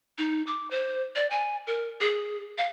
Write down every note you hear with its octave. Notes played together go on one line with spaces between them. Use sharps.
D#4
D6
C5
D5
G#5
A#4
G#4
F5